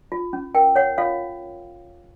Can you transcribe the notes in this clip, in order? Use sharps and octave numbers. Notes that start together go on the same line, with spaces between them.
F4
C#4
A#4 G5
C#5 F#5
F4 F5